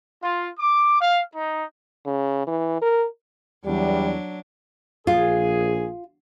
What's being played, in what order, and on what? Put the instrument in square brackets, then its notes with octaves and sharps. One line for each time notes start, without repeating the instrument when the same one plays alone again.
[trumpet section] F4
D6
F5
D#4
[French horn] C#3
E3
A#4
[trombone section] E2 G3 [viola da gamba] F#3 D4
[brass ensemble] A#1 G#4 [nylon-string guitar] F4